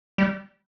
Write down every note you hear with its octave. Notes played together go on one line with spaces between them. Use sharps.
G3